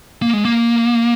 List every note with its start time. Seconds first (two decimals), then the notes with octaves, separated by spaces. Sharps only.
0.22 A#3
0.33 G#3
0.45 A#3